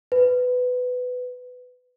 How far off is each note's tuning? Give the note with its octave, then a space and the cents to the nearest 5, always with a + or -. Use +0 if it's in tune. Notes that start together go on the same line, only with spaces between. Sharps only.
B4 +15